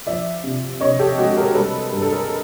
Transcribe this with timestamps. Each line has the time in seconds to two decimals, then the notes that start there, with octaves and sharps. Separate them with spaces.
0.07 F3 D5 E5
0.44 C3
0.81 C3 C#5 D#5
0.99 G4 A4
1.18 G#3 F#4 G#4
1.37 G#4 A#4
1.55 G3 A4 B4
1.92 G2 A#4
2.02 A4
2.12 G#4 A#4